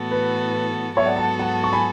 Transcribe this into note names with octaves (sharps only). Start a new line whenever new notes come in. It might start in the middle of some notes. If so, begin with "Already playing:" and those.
Already playing: A2 E3 B3 F#4 A4
B4
G#2 F#3 B3 F#4 A4 C#5 E5
D5 F#5
F#5 A5
F#5 A5
A5 C#6
G#5 B5